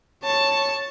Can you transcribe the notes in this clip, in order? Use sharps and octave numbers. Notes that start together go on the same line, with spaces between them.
C#5 A5